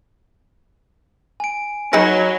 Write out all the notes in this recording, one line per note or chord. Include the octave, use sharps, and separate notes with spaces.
G#5 D7
F#3 D#4 G#4 B4 B5 F#6 A#6